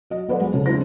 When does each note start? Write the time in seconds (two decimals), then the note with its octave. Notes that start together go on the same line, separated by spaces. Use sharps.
0.10 F#3 D#5
0.28 B3 A4 B4 C5 D5 F#5
0.41 G#3
0.54 C#3 A4
0.66 G#3 C4 D4 E4 C5 A#6